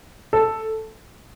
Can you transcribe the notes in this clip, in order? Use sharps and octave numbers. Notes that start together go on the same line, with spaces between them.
A4